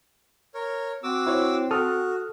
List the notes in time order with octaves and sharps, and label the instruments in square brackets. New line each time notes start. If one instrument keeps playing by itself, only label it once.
[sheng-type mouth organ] A#4 C#5
[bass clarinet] C4 [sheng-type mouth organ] F#4 D6 E6
[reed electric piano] E4 C5 C#5
[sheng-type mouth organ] F#4 [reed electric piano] A4 D#6 F6